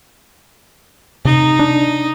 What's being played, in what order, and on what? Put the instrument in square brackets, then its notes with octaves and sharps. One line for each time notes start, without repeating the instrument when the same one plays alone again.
[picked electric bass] C3 [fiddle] D#4
[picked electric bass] D4